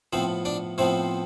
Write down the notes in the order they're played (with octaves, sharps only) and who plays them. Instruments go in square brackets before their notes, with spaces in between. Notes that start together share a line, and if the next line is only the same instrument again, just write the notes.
[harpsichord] A2 F3 B3 C4 C5
D4 D5
A2 F3 B3 C4 C5